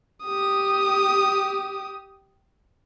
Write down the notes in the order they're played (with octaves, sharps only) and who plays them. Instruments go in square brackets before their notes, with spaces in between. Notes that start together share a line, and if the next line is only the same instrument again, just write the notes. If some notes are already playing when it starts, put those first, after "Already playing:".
[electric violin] G4 D#6